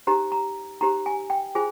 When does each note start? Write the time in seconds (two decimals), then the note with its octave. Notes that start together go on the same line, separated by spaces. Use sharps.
0.07 D#4 G4 C5 A#5
0.32 A#5
0.81 D#4 G4 C5 A#5
1.06 G#5
1.30 G5
1.55 F4 G#4 C5 G#5